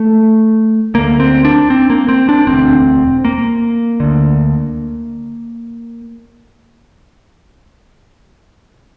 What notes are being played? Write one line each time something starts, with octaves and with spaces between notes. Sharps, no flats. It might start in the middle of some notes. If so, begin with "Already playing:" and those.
Already playing: A3
D2 D3 A#3
C4
D4
C4
A#3
C4
D4
E1 D2 D3 C4
A#3
D2 D3